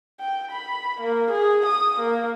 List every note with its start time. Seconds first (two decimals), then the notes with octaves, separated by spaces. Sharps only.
0.20 G5
0.51 B5
1.01 A#3
1.31 G#4
1.66 D#6
2.00 A#3